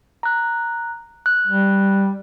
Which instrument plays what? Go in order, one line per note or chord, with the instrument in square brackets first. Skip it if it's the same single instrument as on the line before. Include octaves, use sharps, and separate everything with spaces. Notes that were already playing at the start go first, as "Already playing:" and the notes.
[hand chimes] A#5 F#6
F#6
[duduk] G3